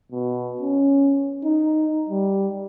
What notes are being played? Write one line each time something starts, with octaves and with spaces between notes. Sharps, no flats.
B2
C#4
D#4
G3